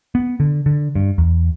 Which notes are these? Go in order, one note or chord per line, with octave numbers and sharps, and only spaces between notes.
B3
D3
D3
G2
E2